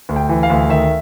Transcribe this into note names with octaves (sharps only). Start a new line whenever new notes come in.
D2
G5
E3
F5
D2
D#3 E5